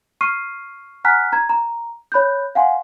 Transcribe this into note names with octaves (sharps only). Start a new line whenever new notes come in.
C#6 F6 C7 D#7
F#5 G#5 A#5 F6 F#6 B6
A#5 G#6
A#5
C#5 B5 F#6 G6
F5 F#5 G#5 C6